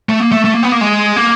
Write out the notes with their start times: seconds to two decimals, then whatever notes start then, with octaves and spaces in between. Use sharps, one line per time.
0.09 A3
0.20 A#3
0.32 A3
0.45 A3
0.54 A#3
0.63 B3
0.72 A#3
0.81 G#3
1.16 A#3